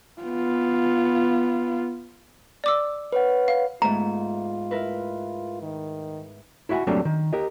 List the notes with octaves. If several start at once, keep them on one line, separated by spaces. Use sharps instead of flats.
B3 F4
D5 D6 E6
B4 C#5 F#5
F5
G#2 A3 B3 F4 A#5
E4 A#4 B4
D#3
E4 F#4 E5 F#5 G#5
F#3 G3 A3 A#3 C4 D4
D#3
G4 A#4 D#5